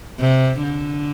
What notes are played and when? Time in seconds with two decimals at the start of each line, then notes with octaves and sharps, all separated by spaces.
0.20 C3
0.63 D3